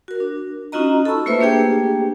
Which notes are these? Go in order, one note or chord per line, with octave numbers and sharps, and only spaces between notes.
F#4 A#4
D4
C#4 D#4 F4 F#4 D#5 A#5
A4 A5 B5 C#6 E6
A3 A#3 F4 B4 C5 E5
A3 A#3 D4 G4 G#4 G5